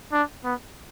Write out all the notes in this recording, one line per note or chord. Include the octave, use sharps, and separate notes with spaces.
D4
B3